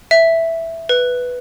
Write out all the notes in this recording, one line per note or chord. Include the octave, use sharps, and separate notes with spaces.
E5
B4